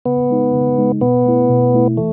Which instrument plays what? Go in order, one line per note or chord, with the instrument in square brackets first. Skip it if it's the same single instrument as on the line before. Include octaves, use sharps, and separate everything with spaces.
[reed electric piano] C#3 [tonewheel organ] B3
[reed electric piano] G#3 D#4
C#3
G#3 D#4
[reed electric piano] B2 [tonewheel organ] B3
[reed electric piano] A3 E4
B2
A3 E4
[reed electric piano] E3 [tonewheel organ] A3